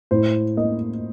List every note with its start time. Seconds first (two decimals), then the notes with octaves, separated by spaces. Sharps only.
0.11 A2 C5
0.57 A#3 D#5